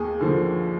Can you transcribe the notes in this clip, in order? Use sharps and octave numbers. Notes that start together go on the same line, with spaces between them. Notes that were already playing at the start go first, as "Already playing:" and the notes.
Already playing: D#2 G#4
D3 F3